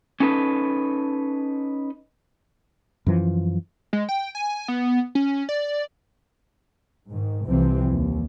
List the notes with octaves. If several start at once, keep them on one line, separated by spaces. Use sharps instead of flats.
C#4 D#4 A4 B4
F#2 E3 F3
G#3
G5
G#5
B3
C#4
D5
G#2 D#3
C2 C3 E3 F3 C4
D#2